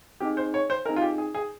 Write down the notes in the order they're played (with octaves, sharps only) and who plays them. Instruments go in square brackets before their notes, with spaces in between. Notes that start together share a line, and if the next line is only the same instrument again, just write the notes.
[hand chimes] C4 D#4 G#4 D#5 G#5 [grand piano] G4
[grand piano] C5
C#5
C5
[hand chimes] C4 D#4 G#4 D#5 G#5 [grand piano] A#4
[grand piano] F4
G4
G#4
G#4